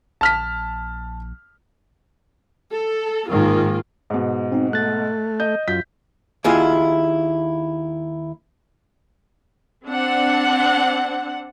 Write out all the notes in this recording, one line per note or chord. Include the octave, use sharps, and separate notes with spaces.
A#1 A5 F6 B6
A4
G#2 D#3 A#3 F4
G#2 B2
C4 D#4
A3 F#6 A6
D#5 G6
F#2 F4 G6 B6
D#2 E4 F4 G#4
C4 D4 F#5